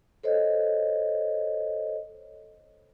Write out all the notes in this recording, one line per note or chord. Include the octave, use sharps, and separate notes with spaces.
A4 C5 C#5 D#5